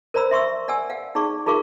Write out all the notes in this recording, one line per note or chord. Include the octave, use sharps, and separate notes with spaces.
A#4 C5 D5 A#5 B5 E6
E5 C6 C#6 E6
D5 F#5 G#5 E6
F5 F#5
D#4 G#4 D5 C#6
D#4 F4 G#4 A#4 F5 C#6